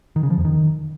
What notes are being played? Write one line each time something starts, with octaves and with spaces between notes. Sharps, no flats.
D#3
C#3
F3
E2
D#3